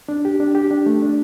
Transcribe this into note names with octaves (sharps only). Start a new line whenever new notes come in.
D4
G4
D4
G4
D4
A3
D4